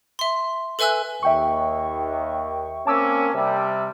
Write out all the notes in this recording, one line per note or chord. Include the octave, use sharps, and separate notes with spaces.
E5 C6
A4 B4 E5 G#5 E6 F#6
D#2 E5 G5 C#6
A#3 C4 C#4 A5 D6 E6
C3 G3